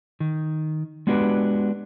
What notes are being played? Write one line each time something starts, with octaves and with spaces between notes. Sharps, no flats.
D#3
G#3 B3 D4 F#4 G4 B4